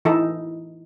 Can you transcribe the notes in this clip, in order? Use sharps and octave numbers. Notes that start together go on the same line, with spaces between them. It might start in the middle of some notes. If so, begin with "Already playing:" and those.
E3 D#4 E4 A4